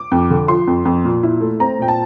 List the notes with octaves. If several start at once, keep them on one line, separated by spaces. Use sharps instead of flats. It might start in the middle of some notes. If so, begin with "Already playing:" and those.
Already playing: D6
F2
D3
F3 C6
F2
F2
A#2
E4
A3
C4 A#5
A#2 G5
A5